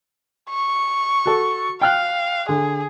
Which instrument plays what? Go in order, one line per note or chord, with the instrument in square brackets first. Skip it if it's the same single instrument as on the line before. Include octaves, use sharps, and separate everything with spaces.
[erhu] C#6
[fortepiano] F#4 A4
[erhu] F5 [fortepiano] G5 F6 F#6
[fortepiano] D3 [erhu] G#4